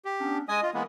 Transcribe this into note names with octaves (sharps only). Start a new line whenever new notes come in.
G4
B3 C#4 D4
G#3 D#5 G#5 D#6
F4
E3 G#3 A#3 B3 E4 A#4